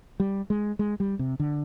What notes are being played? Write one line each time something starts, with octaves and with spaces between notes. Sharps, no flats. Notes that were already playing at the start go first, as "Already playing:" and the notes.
G3
G#3
G#3
G3
C3
D3